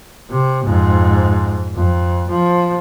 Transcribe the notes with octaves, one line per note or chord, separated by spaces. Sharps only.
C3
F2 G#2
F2
F3